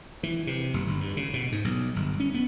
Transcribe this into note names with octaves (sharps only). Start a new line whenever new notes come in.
E3
C3
F#1
G1
G2
C#3
B2
G#2
B1
G1
C#4
B3